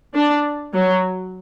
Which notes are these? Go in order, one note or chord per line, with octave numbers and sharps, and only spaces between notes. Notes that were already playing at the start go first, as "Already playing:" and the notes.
D4
F#3